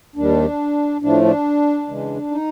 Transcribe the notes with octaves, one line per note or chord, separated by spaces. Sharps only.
D#2 D#3 G3 D4
A2 F3 A3 D4
D4
C#3 E3 G#3
D#4